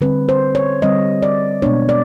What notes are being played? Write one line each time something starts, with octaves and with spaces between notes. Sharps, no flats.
D3 G3 C4 B4
C5
C#5
D3 G3 C4 D#5
D5
B2 G#3 B3 D4 C#5
D5